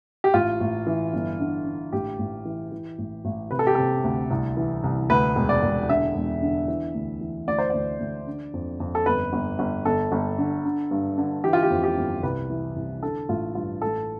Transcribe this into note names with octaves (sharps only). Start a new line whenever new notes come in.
G4
A1 F4
A1
E3
G1
D3
D3
A1 G4
A1
E3
E3
A1
A1
C3 B4
A4
G4
C3 A4
D2
C2
E3
C2
D2 B4
E1
D5
E1
D3 E5
E1
D3
E3
D2
E3
D2 D5
C5
D2 D5
D2
D3
F2
F2
A4
G1 B4
G1
G1
G1 A4
G1
D3
D3
G2
D3
E3 G4
F4
G4
F2
G4
G1
C2 B4
E3
C2
D3 A4
A1 F4
G2 F4
A1 A4